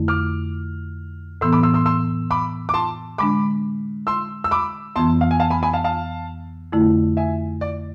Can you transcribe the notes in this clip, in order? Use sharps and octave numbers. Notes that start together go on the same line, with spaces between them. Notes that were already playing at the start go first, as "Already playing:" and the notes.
Already playing: F2 D3 A3 E4
D6 F6
A2 E3 B3 C6 E6
B5 D6
C6 E6
C6 E6
C6 E6
B5 D6
D6
A5 C6
D3 G#3 D4 B5 D6
C6 E6
E6
B5 D6
F2 E3 B3 A5 C6
F5
G#5
F5 A5
G#5 B5
G#5 B5
F5 A5
F5 A5
F2 D3 A3 E4
E5 G#5
D5